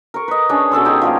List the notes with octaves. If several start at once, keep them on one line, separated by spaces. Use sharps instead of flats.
A#4 C#6
B4 D#5
C#4 D4 G#4
B2 C#4 A4 C6
D#4 G4 G#4
F3 G3 A#3